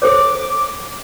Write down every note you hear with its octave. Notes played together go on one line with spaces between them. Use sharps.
A4 C5 C#5 D6